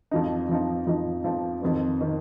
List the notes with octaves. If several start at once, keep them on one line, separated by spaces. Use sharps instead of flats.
F2 F3 D#4
F2 F3 D#4
F2 F3 D#4
F2 F3 D#4
F2 D#3 C4
D#3 C4